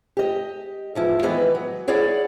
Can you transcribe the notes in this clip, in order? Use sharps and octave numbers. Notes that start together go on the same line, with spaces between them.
G4 D#5
E2 F3 E4
D#3 E3 B3 B4 D#5
F#3
E4 G#4 C#5 D5 F#5